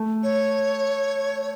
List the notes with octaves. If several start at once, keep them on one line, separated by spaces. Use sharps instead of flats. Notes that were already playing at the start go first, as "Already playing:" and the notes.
Already playing: A3
C#5